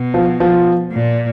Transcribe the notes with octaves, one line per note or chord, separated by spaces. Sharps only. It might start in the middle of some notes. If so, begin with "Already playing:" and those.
Already playing: B2
F3
F3
A#2